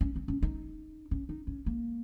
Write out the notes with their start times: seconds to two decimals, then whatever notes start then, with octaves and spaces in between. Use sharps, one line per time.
0.01 C#4
0.16 C4
0.28 C#4
0.43 D#4
1.11 C#4
1.29 D#4
1.47 C#4
1.66 A#3